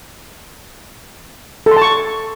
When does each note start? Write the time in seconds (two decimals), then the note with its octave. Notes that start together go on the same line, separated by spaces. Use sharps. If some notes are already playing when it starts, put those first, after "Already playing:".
1.66 A4
1.71 C6
1.77 A5
1.82 C#6